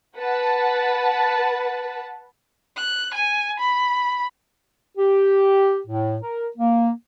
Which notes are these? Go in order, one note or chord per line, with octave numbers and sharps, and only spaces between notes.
B4 F#5 A5
F#6
G#5
B5
G4
A2
A#4
A#3